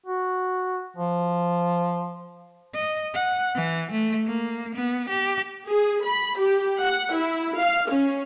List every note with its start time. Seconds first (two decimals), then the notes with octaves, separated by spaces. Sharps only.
0.06 F#4
0.96 F3
2.75 D#5
3.14 F#5
3.55 E3
3.92 A3
4.26 A#3
4.75 B3
5.09 G4
5.69 G#4
6.05 B5
6.39 G4
6.82 F#5
7.14 E4
7.59 F5
7.92 C#4